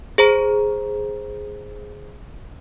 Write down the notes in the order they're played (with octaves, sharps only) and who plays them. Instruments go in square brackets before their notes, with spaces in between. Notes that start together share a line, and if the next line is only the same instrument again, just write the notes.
[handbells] G#4 C5 A#5